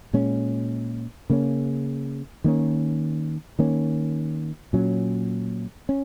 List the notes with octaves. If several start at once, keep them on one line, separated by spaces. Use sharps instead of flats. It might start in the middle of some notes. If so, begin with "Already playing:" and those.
A#2 G#3 C#4
C#3 A#3 C#4
D#3 A#3 C#4
D#3 A#3 C#4
A#2 F#3 C#4
C#4